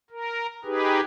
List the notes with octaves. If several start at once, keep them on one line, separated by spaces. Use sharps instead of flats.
A#4
D#4 G4 G#4 B4